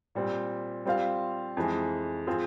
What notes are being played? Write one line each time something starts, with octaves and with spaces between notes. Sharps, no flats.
A#2 G3 C4
G3 C4 F4 C5 F5
F2 E3 G#3
F3 C4 F4 G#4